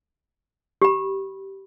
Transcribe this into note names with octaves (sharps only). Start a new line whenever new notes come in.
G4 B5